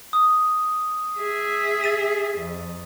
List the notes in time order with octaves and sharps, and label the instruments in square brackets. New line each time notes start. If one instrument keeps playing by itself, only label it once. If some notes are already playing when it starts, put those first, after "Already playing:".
[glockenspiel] D#6
[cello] G#4 E5
[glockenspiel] A6 D#7
[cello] F2